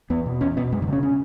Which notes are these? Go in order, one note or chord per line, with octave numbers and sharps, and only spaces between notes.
E2 B3
B2
E2 C#4
B2 B3
F#2 G#3
D3
C#3
C#4
C#4